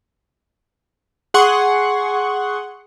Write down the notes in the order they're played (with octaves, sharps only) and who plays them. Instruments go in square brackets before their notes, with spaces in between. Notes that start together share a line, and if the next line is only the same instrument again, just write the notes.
[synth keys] G#4 F#5 C6 C#6